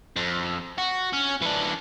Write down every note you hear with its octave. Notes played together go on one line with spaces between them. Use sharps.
F2
F#4
C#4
E3 D4